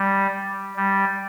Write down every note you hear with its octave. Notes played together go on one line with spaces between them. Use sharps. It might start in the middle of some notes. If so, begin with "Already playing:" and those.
Already playing: G3
G3